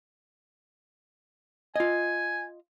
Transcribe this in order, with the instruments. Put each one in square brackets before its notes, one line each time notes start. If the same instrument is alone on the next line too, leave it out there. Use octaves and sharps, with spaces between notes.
[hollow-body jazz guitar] F4 D#5 [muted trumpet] G#5